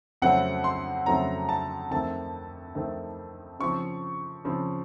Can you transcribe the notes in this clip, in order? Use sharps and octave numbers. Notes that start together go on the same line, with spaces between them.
F2 C#3 F#3 A3 C4 F#5
C6
F2 C#3 F#3 A3 C4 A#5
A5
F2 D#3 A3 C4 A5
F2 D#3 A3 C4
C#3 F3 C4 C#6
C#3 F3 C4